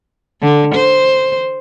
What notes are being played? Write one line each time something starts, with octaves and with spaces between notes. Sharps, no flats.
D3
C5